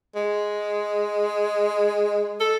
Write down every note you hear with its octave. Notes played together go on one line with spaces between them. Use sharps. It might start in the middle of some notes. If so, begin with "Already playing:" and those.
G#3
A4